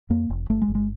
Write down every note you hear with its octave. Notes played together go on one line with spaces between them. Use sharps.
F2 A#3
F1
G1 A3
G#3
G1
G#3